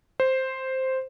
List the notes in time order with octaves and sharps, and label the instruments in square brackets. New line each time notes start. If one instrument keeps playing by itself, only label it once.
[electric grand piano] C5